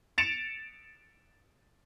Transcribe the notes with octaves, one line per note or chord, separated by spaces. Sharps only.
A6 C#7 D7 E7 F7